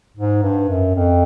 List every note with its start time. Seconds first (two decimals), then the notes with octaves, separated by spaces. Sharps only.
0.17 G#2
0.43 G2
0.69 F#2
0.95 F2